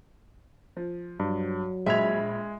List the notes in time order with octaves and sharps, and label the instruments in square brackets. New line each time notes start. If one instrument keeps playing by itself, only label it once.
[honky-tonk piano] F3
[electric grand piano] G2 [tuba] F#3
[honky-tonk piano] A#1 B5 F7 [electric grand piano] G#3 G#6 [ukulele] E5